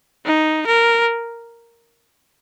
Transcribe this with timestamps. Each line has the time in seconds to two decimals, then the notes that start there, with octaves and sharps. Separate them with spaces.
0.25 D#4
0.67 A#4